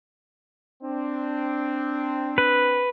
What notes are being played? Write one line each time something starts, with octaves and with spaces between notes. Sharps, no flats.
C4 D4
B4